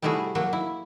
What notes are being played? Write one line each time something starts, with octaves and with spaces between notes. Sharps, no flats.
C3 G3 A3 E4 F#4 G#4
F#3 A#3 F#4
E4